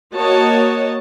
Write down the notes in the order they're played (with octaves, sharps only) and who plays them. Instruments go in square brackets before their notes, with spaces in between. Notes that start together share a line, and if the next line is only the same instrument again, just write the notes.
[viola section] A#3 F#4 C#5 D#5 A5